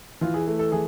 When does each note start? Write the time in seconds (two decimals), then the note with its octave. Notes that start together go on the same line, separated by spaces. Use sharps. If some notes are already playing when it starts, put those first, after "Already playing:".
0.21 E3 F4
0.34 G#4
0.47 A3
0.59 A4
0.72 E3 G#4